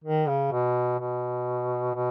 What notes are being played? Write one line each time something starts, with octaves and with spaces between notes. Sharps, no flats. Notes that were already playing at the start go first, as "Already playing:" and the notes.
D#3
C#3
B2
B2
B2